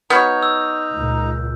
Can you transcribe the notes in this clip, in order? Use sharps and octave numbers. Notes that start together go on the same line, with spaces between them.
B3 D#4 F#4 C#5 A#5 F6 G6
E6
C#2 A#2